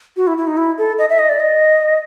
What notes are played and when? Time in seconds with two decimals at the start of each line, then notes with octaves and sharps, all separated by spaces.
0.17 F#4
0.27 E4
0.37 E4
0.47 D#4
0.57 E4
0.78 A4
0.98 D#5
1.09 E5
1.18 D#5
1.29 D5
1.40 D#5